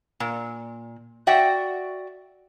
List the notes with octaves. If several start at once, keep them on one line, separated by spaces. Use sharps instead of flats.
A#2
F#4 D5 E5 F#5 G5